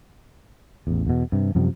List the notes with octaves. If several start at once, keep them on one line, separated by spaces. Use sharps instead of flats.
A1 E2
E2 B2
G2 C3
F#2 C3 F3 G3